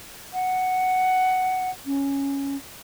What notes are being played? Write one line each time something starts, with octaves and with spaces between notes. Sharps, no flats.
F#5
C#4